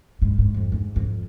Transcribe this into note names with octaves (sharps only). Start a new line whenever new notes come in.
G#2
G#2
F2
G#2
F2